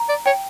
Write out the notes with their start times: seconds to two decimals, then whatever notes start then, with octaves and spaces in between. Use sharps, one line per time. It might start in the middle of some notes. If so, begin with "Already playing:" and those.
Already playing: A#5
0.09 D5
0.26 C#5 G5